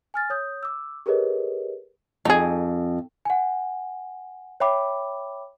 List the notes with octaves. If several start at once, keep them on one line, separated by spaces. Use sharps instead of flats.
G#5 F6 A6
C#5 D#6 G6
D6 E6
G4 G#4 A#4 B4 C#5 D#5
F2 D#4 G#4
F#5 G#5
C#5 E5 G5 B5 D6